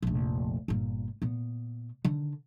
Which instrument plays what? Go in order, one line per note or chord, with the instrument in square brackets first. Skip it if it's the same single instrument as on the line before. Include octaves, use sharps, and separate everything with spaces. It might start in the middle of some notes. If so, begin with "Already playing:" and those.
[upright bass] F1 A#1
G1 A#2
A#2 B3
D3 D#3